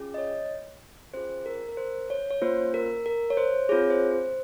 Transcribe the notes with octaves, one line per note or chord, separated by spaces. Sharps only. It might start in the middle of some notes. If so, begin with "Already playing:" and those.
Already playing: C#4 F4 G#4
D#5
C#5
C#4 F4 G#4 C5
A#4
A#4
C5
C#5
C#5
A#3 C#4 F4 C5
A#4
A#4
C#5
C5
C4 F4 G#4 C#5
C5
C5